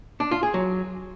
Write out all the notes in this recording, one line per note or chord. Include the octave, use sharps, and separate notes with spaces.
D4
F4
G#4
F#3